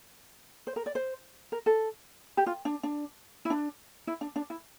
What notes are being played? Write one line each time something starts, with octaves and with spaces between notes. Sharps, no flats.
C5
A#4
D5
C5
A#4
A4
G4
F4
D4
D4
E4
D4
E4
D4
D4
E4